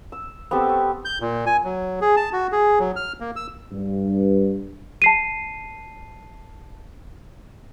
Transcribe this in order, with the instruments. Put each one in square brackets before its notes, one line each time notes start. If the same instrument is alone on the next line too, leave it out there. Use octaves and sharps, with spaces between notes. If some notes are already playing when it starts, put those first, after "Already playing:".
[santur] E6
B3 C4 G4 A4
C#6
[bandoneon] G6
A#2
G#5
F#3
G#4
A5
F#4
G#4
F#3
F6
A#3
E6
[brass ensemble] G2
[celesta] A5 C7 D#7